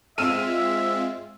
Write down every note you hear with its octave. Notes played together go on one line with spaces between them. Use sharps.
G#3 C4 F4 E5 E6 F6 D#7